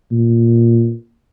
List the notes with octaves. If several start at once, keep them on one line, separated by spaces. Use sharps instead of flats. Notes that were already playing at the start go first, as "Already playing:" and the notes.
A#2